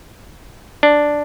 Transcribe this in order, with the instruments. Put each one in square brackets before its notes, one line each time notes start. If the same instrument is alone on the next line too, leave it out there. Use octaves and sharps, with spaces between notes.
[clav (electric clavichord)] D4